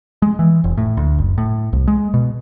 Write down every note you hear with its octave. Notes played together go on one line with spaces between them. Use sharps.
G#3
E3
F1
A2
D2
F#1
A2
C2
G#3
B2